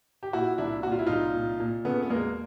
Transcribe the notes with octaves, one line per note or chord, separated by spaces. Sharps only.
G4
A#2 E4 F#4
C2 D4 E4
A#2 F#4
F4
E4
C2 D#4 F4
A#2
A#2
C#3 A3 B3
B3
E1 G#3 A#3